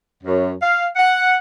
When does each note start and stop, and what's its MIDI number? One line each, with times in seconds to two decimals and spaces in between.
0.24 0.52 42
0.61 0.87 77
0.95 1.34 78